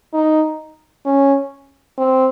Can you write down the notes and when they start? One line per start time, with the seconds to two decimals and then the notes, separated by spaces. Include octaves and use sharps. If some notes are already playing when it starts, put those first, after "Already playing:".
0.13 D#4
1.05 C#4
1.98 C4